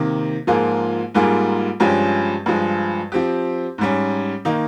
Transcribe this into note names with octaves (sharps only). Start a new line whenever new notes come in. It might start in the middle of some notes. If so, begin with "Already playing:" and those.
Already playing: C3 D#3 A#3
G#2 F3 A#3 F4 G#4
G#2 G3 A#3 F4 G#4
G2 F3 G#3 C#4 G4
G2 F3 G#3
F3 C4 G4
G#2 G3 C#4
D#3 A#3 D#4